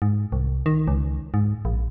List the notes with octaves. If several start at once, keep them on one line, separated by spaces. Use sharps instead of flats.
G#2
C2
D#3
C#2
G#2
A#1